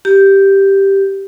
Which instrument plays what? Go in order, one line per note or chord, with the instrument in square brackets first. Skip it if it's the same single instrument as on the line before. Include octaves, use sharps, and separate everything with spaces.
[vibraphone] G4